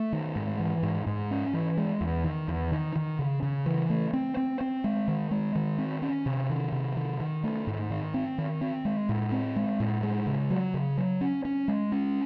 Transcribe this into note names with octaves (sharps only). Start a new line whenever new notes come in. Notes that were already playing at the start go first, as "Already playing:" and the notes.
Already playing: A3
D#3
G#2
E3
G#2
G#2
C#4
E3
G#3
E2
D#3
E2
D#3
D#3
C#3
C#3
E3
A3
C4
C4
C4
G#3
D#3
G#3
D#3
C4
C#4
C3
D#3
C3
D#3
D#3
A3
G#2
D#3
C4
D#3
C4
G#3
A2
C4
G#3
A2
G#3
C#3
F#3
C#3
F#3
C#4
C#4
G#3
C#4